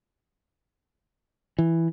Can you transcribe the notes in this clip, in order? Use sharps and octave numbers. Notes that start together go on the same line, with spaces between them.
E3